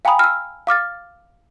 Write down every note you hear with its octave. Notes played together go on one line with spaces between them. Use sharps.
F5 G5 G#5 A#5 B5 D#6
E6 F6
F5 D6 F6 A6